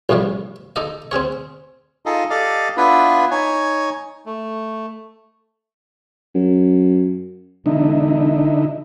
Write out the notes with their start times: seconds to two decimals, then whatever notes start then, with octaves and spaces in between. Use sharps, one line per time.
0.09 A1 F2 A2 C3 G3
0.76 D#4 A4 D5 D#5
1.11 C4 C#4 G#4 C#5
2.06 D#4 F4 G#4 A4 D#5
2.30 G4 A4 D5 D#5 F5
2.77 B3 D4 E4 F4 B4
3.31 D#4 C#5 G#5
4.26 A3
6.35 F#2
7.66 E1 D3 D#4 E4